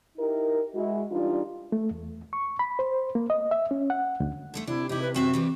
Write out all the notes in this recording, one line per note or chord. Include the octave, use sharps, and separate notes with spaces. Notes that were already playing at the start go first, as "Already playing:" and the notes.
D#4 E4 G4 A#4
G#3 E4 F#4
E3 G3 D4 D#4 F4
A3
E2
C#6
B5
C5
A#3
D#5
E5
C#4
F#5
D2
D3 G#3 A3
C3 D4 E4
C3 D#4 E4 G4
B4
F#2 C4 F#4 E5
E3 G3 C4